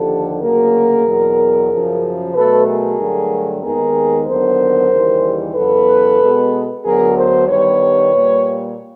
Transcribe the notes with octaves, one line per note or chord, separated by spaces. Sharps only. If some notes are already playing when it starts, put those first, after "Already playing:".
Already playing: D#2 D3 F3 G4 A4
D2 C#3 F#3 A#3 G#4 A#4
E2 B2 F#3
F#2 C#3 F3
B2 F#3 A3 A4 B4
G#4 A#4
G2 D3 F#3 A3
D#2 D#3 G#3 B3 G#4 A#4
D#2 D3 F#3 B3 A#4 C5
D#2 C#3 E3 G3
E2 C#3 F#3 B3 A4 B4
B2 G#3 B3
D2 D3 F#3 B3 G#4 A#4
A#4 C5
G2 D#3 G3 B3 B4 C#5
A#2 G3 A#3